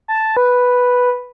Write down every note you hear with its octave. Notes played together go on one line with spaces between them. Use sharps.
A5
B4